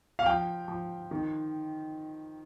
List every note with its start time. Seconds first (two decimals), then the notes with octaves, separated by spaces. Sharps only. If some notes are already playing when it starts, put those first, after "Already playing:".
0.19 F5
0.26 F3 G5
0.68 F3
1.11 D#3